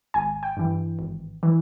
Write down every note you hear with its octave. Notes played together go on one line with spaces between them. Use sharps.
G#1 G#5
G5
G2 E3
G#1
E3